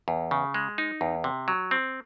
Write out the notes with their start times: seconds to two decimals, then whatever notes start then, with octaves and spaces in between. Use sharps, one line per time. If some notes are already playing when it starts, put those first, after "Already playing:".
0.08 E2
0.31 C#3
0.54 G#3
0.78 D#4
1.01 E2
1.24 C3
1.48 F#3
1.71 C4